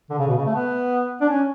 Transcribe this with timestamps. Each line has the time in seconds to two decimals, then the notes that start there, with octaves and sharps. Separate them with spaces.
0.10 D3
0.19 C#3
0.28 B2
0.37 C#3
0.46 A3
0.55 B3
1.21 D4
1.29 C#4